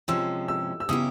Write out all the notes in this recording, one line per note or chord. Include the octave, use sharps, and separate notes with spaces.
C3 F3 G#3 C#4 E6
E6
E6
C#3 F#3 B3 E4 G4 D#6